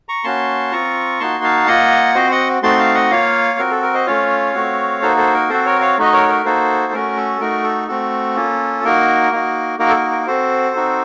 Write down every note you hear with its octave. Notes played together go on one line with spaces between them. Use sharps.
A#5 C#6
A#3 C#4 F#4 A5 C6
C4 F4 A#5 C#6
A#3 D#4 F#4 A5 C6
F5 A5
A#3 F4 D#5 F#5
C4 F#4 C5 D#5
D#5 F#5
A3 C4 D#4 F#4 A5 C6
F5 A5
D#5 F#5
A#3 F4 C#5 F5
C4 F#4 A#4
A4
A#4
C5 D#5
A3 C#4 F4 C#5 F5
A3 C4 F#4
A#3 D#4 F#4 A4 C5
A4 C5
A#4
C4 F#4 A4 C5
A#4 C#5
C#5 F5
A3 D#4 F#4 D#5
A#4 C#5
A#4
A#3 D#4 F#4 A4 C5
A3 C#4 F#4 A#4
A4
A3 D#4 F#4 A#4
A4
A3 C4 F#4 A4
A#3 C#4 F4
A#3 D#4 F#4 A#4
A#3 D#4 F#4
A#3 D#4 F#4 A#4
A4
A#4
A#4
A#4
C4 F#4 A4 C5
C4 D#4 F#4